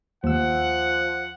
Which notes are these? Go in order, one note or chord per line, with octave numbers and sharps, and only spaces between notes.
D#2 F3 F#5 E6